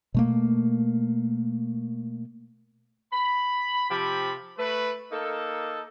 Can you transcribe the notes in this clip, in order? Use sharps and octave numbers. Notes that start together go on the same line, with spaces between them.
B2 A3 A#3
B5
C3 F3 G4 G5 B5
A3 B4
A#3 D#4 A4